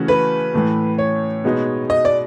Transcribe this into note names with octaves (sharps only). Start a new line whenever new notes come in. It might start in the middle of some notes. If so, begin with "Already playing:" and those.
Already playing: C#3 E3 A3 C#4 F#4
B4
A2 E3 A3
C#5
B2 G#3 B3 D#4
D#5
D5